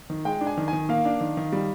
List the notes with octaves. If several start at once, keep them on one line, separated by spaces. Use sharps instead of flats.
D#3
G#3 G5
D4
G#5
D#3
D#3 G#5
A#3 F5
D4
D#3
D#3
G3